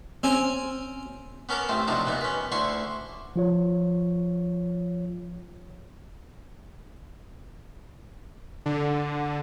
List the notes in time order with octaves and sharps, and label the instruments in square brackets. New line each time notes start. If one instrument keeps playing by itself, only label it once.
[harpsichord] C4 C#4 G#5
B3 C#4 A#4 A5 D6
A1 A3 C4
C3 F3 F#3 D4 D#4
A#2 B3 D#4
C#4 B4
D2 D3 E4 C6 C#6
[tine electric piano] F3 F4 C#5
[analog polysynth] D3